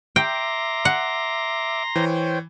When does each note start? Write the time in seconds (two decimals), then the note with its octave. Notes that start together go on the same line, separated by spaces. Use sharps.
0.16 E5 G5 A#5 C6 D6 A#6
0.85 F#5
1.96 E3 C5 C#5 G5